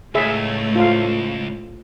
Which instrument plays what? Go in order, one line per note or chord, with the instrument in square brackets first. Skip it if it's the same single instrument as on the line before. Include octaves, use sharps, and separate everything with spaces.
[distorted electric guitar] C#2 [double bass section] A2 [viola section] A3 [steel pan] G#4 E5
[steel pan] F4 F5